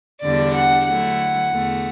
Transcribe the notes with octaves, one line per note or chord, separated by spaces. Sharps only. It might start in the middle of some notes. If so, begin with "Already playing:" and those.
E2 D3 G3 D4 D5
F#5
D3 F#3 A3 E4 F#5
E2 D3 A3